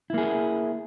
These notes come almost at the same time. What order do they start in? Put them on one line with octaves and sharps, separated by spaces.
E4 A#3 G#4